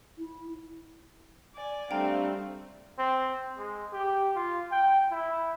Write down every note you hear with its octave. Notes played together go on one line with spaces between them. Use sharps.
E4
D5 G#5
G3 A3 C4 D4 F5 G5 A#5
C4
G#3
G4
F4
G5
E4